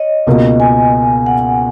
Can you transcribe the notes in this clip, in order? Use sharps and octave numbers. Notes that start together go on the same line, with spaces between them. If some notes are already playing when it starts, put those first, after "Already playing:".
Already playing: C#5 D#5
C#2 B2 A#3
G#5
F#5